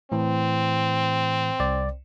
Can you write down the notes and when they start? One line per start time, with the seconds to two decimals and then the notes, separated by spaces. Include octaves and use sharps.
0.12 A2 E3 C4
1.60 C2 D5